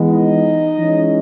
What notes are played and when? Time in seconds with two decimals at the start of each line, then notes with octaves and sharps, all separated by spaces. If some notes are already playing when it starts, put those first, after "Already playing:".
Already playing: E3 G#3 B3
0.10 D#4 D#5
0.78 E3 G#3 C#4